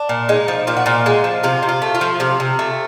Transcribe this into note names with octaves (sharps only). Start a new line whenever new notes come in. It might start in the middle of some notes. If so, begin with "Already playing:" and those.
Already playing: D4
A#2
G#3 D#4
F3
A#2 F4
F#4
A#2 F4
G#3
F3
C3 F4
C3
F4
A3
F4
F3
C3 F4
C3
A3